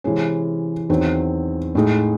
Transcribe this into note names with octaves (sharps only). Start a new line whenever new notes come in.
C3 E3 G#3 C#4
E2 D#3 F#3 C4
A2 G#3 D#4